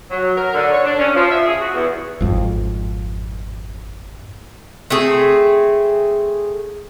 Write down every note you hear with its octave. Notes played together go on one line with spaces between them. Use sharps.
F#3
A#4
D3
C#5
D4
C#4
F3
E5
G#4
F#4
E2
G#1 F2
A3 C4 G#4